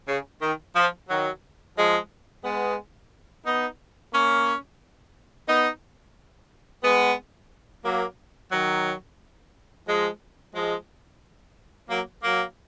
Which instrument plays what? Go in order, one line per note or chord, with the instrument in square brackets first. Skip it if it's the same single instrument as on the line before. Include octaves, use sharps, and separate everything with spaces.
[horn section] C#3
D#3
F3
D#3 F#3
F3 G#3
G#3 B3
B3 D#4
A#3 C#4
B3 D#4
G#3 B3
F#3 A#3
D#3 F#3
F3 G#3
F3 G#3
F#3 A#3
F#3 A#3